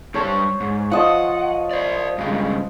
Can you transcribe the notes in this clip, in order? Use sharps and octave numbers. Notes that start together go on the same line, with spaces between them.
G2 G3 C5 C#5 A5
G#2
F3 D#5 F#5 A5
C5 D5
G2 C#3 G#3